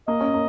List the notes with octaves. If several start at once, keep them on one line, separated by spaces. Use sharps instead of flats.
A#3 D#5
C#4
A#3